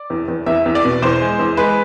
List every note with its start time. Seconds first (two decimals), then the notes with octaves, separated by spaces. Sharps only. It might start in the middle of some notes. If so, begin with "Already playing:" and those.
Already playing: D5
0.10 E2
0.28 E2
0.46 E2 E5
0.66 E2
0.75 D5
0.85 B2
1.02 E2 C5
1.22 G#3
1.39 E2
1.57 G#3 B4